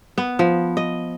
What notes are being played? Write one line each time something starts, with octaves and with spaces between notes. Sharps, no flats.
B3
F3
D#5